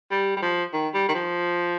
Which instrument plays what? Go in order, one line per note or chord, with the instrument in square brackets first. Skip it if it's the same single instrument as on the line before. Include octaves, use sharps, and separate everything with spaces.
[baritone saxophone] G3
G3
F3
D#3
G3
D#3
F3